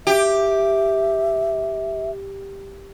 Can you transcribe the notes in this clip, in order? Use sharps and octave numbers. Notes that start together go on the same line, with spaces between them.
G4 E5